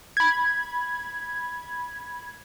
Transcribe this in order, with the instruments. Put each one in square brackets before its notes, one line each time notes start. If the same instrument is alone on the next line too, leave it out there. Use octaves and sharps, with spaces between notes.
[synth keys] B5 G#6